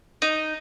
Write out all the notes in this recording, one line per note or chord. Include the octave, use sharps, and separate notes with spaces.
D#4